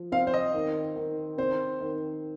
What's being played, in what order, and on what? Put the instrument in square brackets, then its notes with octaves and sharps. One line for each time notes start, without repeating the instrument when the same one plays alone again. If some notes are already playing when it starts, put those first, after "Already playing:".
Already playing: [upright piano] F3
[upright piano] C4 [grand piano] F5
[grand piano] C5
D#5
[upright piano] D#3
D#3
[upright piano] C4 [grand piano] C5
[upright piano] D#3